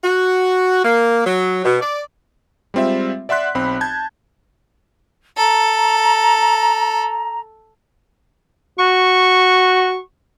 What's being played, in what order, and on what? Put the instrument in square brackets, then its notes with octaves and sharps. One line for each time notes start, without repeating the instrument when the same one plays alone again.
[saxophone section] F#4
A#3
F#3
B2
D5
[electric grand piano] G3 G#3 C4 F4 E5
D5 E5 F#5 C6 F#6 B6
B1 C4 B5
A5 G6 G#6
[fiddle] A4 [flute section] A#5
[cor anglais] F#4 [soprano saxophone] C#6